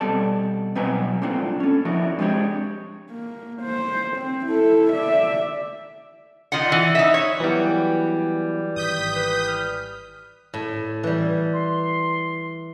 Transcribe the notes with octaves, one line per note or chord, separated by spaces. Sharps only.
B2 G3 C4 A4 D5 A5
B2 F#3 C4 B4 G#5 A#5
A3 A#3 C4 D4 F4
C#4 A4
F3 D4 E4 F#4 A#4
G#3 B3 C4 D4 G4 C#5
A#3
C5
C4
E4 A4
D5 E5
D#3 F4 D5 F#5
E3
D#4 E5
C#5
E3 F#3 G3 B3 E4 B4 G5
G#1 D#6 G6 B6
B4
F6
A2
E3 G3
C6